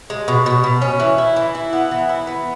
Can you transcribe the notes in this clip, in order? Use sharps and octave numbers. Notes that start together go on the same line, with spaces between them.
G#3
B2
B2
B2
C#4
E3
E4
E3
E4
B3
E3
E4
B3